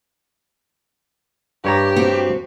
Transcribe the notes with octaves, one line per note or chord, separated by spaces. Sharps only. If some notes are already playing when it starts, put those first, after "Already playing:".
G2 G4 C#5 A#5
C4 F#4